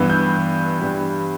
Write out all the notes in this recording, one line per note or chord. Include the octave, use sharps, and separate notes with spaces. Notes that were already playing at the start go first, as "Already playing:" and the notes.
Already playing: G2 E3 B3 E6
G6
G2 E3 G3 B3